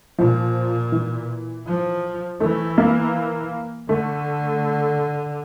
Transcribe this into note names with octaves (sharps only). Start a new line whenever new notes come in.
A#2 F3
E3
F3
E3 A3
A#3
D3 A3